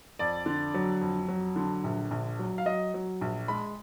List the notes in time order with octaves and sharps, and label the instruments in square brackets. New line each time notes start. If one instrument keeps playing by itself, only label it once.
[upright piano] F2 D5
D3
F#3
F2
F#3
D3
A#1
A#1
F#3
F5
F#3 D#5
F#3
A#1
G#3 B5